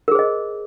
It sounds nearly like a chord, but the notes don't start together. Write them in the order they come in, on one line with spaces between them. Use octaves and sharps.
A#4 G#4 C5 D#5